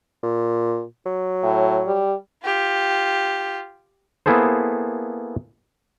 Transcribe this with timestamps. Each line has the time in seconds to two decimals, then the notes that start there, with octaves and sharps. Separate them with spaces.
0.23 A#2
1.06 F#3
1.43 A2
1.87 G3
2.43 F4 G4
4.26 A#3 B3 E4 G#4 A4 C5